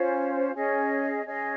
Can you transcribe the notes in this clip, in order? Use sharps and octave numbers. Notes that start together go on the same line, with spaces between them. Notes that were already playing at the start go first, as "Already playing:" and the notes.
Already playing: C#4 F4 C5
C#4 G#4 D#5
C#4 G#4 D#5